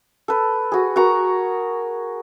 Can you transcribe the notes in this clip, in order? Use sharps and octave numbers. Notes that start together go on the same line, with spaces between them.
A4 B4
F#4 G#4
F#4 A#4 A#5 C#6